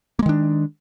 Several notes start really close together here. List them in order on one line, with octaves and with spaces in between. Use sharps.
A#3 G#3 D#3 D4